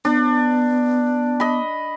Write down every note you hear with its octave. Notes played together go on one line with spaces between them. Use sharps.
B3 D4
D#5 B5